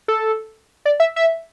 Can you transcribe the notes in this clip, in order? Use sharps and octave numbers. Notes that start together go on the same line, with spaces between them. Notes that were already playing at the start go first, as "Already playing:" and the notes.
A4
D5
E5
E5